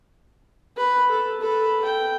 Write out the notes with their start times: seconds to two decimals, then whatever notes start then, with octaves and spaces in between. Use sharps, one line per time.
0.76 B4
1.11 A4
1.40 A4 B4
1.84 G5